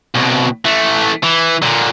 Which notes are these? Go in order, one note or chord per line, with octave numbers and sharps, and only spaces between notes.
C2 B2
E3 A3
E3
A#2 D3